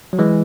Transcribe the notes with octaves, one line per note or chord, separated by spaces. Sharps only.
F#3
E3 G#3